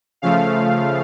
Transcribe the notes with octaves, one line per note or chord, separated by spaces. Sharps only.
C#3 F3 A3 F5